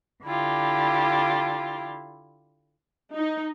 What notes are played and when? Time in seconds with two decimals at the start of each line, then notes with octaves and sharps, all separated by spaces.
0.25 D3 E4 F4 G4
3.14 D#4